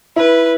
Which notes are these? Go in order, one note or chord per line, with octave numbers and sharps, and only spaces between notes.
E4 B4